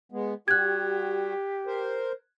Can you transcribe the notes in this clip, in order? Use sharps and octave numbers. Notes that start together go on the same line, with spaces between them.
G#3 B3
G3 F#4 G4 F#6 G#6
A#4 C5